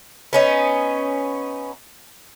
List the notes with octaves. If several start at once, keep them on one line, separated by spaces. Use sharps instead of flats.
B3 C#4 D#4